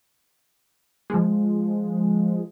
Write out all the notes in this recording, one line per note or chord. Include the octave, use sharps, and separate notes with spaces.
F3 G#3